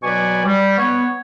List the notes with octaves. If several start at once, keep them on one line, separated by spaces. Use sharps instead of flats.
B2 F#3 B4 D5 G#5 C#6
G3
B3 C#5